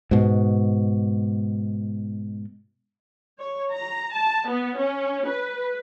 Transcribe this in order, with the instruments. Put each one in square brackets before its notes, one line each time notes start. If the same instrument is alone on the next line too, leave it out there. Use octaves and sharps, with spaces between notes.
[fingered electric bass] G#2 B2
[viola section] C#5
A#5
A5
B3
C#4
B4